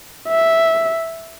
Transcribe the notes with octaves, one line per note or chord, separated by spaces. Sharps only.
E5